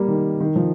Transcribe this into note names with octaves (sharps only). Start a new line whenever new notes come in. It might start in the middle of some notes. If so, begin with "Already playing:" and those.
Already playing: G3 A#3
D#3
D#3
F3